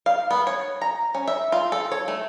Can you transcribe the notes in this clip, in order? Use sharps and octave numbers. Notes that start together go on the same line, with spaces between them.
F5
B3
C#5
A#5
C#4
E5
F4
A4
C#5
A3